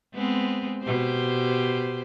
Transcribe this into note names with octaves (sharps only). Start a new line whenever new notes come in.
G#3 B3 C4
B2 G4 C5